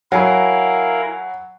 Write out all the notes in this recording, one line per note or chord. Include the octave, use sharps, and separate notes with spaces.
F#3 E4 A#4 F5 F#5 G#5 B5